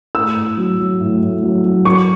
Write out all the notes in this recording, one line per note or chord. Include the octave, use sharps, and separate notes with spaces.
A2 E6
A2
F#3
F#3
A2
A2
F#3
F#3
F#3 C#6